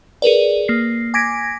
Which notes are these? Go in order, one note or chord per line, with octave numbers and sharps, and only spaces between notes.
G#4 A#4 B4 D5
A#3 C7
G#5 D6 G#6 A#6 B6 D7